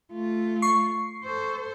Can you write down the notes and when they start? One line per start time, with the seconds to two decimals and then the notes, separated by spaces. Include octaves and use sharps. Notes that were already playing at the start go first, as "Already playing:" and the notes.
0.12 A3 F4
0.62 C#6 C7
1.24 A4 C5